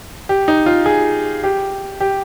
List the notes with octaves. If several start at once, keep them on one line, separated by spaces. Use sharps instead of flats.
G4
D#4
F4
G#4
G4
G4